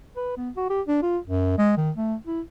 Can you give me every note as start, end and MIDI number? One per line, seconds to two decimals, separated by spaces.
0.17 0.36 71
0.37 0.50 59
0.57 0.66 66
0.70 0.81 67
0.88 0.98 62
1.03 1.18 65
1.25 1.54 42
1.58 1.74 56
1.77 1.91 51
1.97 2.15 57
2.27 2.41 64